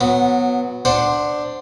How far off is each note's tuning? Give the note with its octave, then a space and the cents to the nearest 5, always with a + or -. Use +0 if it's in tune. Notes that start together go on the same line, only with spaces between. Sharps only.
F#3 -20 B3 +0
D4 +10 C5 +0 F#5 +0